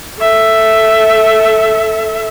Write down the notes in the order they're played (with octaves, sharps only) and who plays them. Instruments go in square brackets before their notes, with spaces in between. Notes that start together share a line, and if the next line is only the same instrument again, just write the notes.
[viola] A4 E5